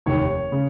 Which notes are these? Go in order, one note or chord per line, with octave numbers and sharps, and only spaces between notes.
F1 D#2 D#3 C#5
C#3